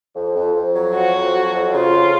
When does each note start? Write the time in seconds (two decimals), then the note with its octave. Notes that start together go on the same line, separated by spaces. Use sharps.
0.16 F2
0.35 F2
0.55 F2
0.75 F#3
0.95 F2 F#4
1.14 F2
1.33 F#3
1.54 F2
1.74 C#3 F4
1.93 F2